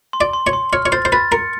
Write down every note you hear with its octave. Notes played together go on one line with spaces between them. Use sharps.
C6
D5
C6
C#5
C6
C#5 F6
C#5
C5 A6
C5
B4 A6
A#4 C#7